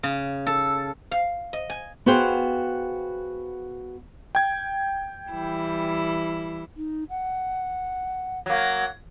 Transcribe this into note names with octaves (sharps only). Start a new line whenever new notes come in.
C#3
A4
F5
D#5
G#5
B3 F#4 G#4 C5 F5 G5
G5 G#6
E3 G3 E4
D#4
F#5
F#3 A#3